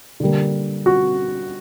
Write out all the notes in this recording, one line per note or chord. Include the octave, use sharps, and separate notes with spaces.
D3 G3 A#3
F#4